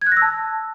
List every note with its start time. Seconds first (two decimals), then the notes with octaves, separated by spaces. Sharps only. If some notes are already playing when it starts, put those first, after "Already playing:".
0.02 G#6
0.07 F#6
0.12 A#6
0.17 E6
0.22 A5